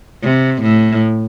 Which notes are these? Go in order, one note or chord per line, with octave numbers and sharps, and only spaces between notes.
C3
A2